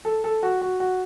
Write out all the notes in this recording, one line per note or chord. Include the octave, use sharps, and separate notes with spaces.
A4
A4
F#4
F#4
F#4